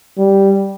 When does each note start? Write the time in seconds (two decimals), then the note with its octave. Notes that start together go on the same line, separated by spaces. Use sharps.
0.18 G3